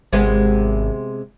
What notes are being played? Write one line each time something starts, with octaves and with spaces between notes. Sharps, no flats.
G#1 C3 G#3 B3